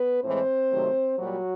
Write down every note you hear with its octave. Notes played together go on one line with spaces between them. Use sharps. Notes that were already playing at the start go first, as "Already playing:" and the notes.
Already playing: B3 B4
A2 E3 G#3 C4 C5
C3 D#3 F#3 A3
A#2 F#3 G3 F#4